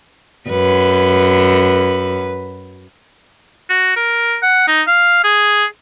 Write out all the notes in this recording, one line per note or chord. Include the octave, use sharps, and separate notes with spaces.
F#2 B4
F#4
A#4
F#5
D#4
F5
G#4